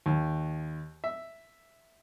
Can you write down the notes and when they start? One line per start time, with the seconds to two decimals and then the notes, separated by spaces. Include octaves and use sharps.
0.06 D#2
1.04 E5